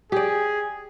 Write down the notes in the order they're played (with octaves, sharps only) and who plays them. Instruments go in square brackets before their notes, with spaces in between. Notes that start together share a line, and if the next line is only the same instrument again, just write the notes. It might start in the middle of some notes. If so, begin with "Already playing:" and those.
[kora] G4 D5 [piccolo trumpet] G#4